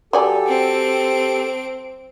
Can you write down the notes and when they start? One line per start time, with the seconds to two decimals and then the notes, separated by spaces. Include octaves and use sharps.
0.13 F#3 G4 A4 D5 G#5
0.48 C4 D7